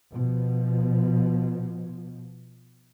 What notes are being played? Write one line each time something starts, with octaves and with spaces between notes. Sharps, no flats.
B2 F3